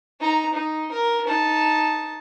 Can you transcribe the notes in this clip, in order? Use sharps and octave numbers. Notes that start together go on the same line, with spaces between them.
D#4 A#5
D#4
A#4
D#4 A5